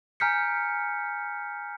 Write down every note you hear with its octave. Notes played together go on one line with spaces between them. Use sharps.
G#5 A#5 F6 G6 B6 C#7